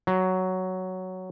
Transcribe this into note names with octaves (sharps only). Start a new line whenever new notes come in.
F#3